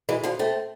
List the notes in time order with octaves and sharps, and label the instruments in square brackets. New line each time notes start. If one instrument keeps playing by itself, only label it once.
[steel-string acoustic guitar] E3 G#3
D3 F3
A3 C4